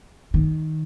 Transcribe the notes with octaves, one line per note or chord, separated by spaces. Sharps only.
D#3